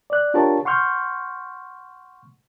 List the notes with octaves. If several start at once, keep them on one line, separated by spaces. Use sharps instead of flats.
D5 F#6
D4 F4 G4 A#4 C#5 A5
F#5 C6 C#6 F6 G6